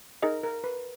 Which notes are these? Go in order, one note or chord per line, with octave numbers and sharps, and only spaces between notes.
D#4 G#4 A#4 D#5
A#4
B4